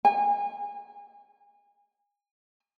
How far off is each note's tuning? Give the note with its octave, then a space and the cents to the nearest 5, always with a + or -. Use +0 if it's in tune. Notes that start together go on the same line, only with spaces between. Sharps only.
G#5 -30